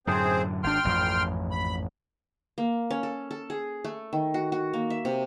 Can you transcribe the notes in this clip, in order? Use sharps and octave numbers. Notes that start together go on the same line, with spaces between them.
F#2 A2 D3 C4 G#4 C5
G#1 D4 G5 C6 F6
A1 F2 G#2
B5
A#3
C#4
A4
A4
G#4
A3
D#3
F#4
F#4
A#3
E5
C3